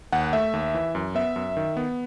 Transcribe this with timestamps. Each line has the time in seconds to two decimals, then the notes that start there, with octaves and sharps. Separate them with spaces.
0.12 D#2 F#5
0.33 A3 E5
0.53 D#2
0.74 E3
0.95 F#2
1.15 B3 E5
1.36 F#2
1.57 D#3
1.77 B3